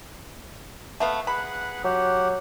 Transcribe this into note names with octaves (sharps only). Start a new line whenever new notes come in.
A3 B3 F5
G#4 B4 F#5 B5
F#3 G4 F#5